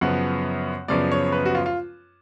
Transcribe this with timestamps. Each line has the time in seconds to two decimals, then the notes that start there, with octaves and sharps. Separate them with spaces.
0.01 F#2 C#3 F3 B3 F#5
0.88 F#2 C#3 F3 B3 D5
1.12 C#5
1.32 B4
1.46 F#4
1.55 F4
1.66 F4